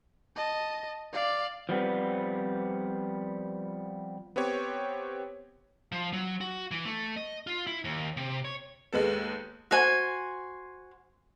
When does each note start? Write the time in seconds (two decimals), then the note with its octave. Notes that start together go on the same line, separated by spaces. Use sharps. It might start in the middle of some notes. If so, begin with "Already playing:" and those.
0.36 D#5 A5
1.13 D5 F5
1.69 F3 G3 B3 C4
4.36 B3 C4 G4 C#5
5.92 F3
6.13 F#3
6.41 F#4
6.71 E3
6.85 A3
7.17 D#5
7.47 F4
7.67 E4
7.84 D#2
8.17 C3
8.45 C#5
8.93 D#2 G#3 B3 A4
9.71 F#4 C5 G#5